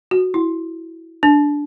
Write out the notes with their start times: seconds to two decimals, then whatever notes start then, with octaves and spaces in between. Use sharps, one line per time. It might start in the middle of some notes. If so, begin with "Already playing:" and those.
0.11 F#4
0.34 E4
1.23 D4